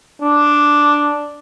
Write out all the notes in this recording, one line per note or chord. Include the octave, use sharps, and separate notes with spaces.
D4